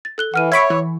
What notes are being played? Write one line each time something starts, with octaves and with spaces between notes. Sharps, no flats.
A6
A4 F#6 G7
E3 F#5 F6 D#7
C#5 E5 B5 C#6 G#6 B6 D7
E3